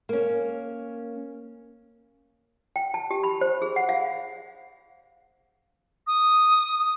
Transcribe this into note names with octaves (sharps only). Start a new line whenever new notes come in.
A#3 C#4
G5
A5
G4
B5
C5
G#4
F#5
F5
D#6